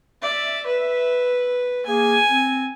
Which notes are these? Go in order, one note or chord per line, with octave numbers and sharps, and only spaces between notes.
D5 E5
B4
A#3 G#4 G#5
C4